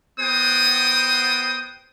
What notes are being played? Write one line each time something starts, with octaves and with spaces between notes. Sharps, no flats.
B3 F#4 C5 G5 D#6